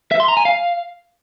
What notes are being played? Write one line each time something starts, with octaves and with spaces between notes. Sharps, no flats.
E5
C6
A#5
G#5
F5